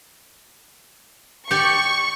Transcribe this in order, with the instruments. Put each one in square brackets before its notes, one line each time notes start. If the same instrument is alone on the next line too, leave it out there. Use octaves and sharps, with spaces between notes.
[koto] G4 D5 [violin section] C#6